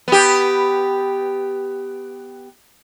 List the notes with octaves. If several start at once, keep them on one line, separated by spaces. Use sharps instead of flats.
B3 G4